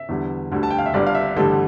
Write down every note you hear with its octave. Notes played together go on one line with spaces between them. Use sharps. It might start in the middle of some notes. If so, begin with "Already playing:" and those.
Already playing: E5
E2 D3 G3
D2 D3 G3
A5
G5
F5
E5
G1 G2 D3 G3 D5
F5
E5
A1 G2 D3 G3 A4